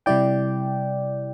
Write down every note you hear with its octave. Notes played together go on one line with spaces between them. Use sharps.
C3 G3 E4 D5 G5